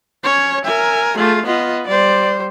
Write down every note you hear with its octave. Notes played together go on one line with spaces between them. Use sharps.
C#4 C#5
A#4 E5 G#5
A3 F4 G#4
B3 F4 D#5
G3 C5 D5